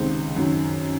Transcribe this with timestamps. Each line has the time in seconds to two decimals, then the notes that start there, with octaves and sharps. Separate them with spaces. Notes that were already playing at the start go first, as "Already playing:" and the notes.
Already playing: C#2 C3 D#3 C5
0.36 F#2 D#3